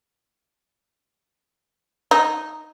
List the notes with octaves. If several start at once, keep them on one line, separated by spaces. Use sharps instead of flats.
D#4